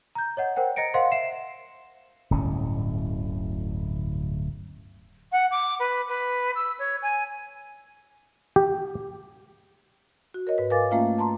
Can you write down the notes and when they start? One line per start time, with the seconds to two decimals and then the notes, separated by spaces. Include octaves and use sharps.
0.15 A#5 G6
0.37 C#5 D#5 F#5
0.56 A#4 C5 F#5 G5
0.76 D#5 A#5 A#6 C#7 D7
0.94 A#4 C5 D#5 F5 F#5 C6
1.12 E5 C7 E7
2.31 D1 G1 A2 C#4
5.31 F#5
5.50 D6
5.79 B4
6.08 B4
6.55 E6
6.78 C#5
7.02 G#5
8.56 G4
10.34 F#4
10.47 A#4 C#5 D#5
10.58 G#2 B4
10.70 A#4 B4 F5 G#5 D6 A6
10.91 A3 A#3 C#4 F4 E5 F5
11.18 A5 A#5 C6